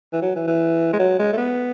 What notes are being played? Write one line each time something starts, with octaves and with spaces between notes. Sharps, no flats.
E3
F#3
E3
E3
G#3
F#3
G#3
A3
B3